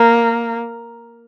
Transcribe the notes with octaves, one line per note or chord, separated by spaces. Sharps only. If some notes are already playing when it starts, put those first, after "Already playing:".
Already playing: A#3